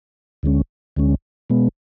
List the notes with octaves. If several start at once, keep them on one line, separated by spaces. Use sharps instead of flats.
D2 D3 G#3 C#4
D2 D3 G#3 C#4
B2 G#3 B3